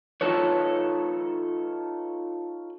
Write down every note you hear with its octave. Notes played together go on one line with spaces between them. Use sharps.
D#4 F4 A4 B4 C#5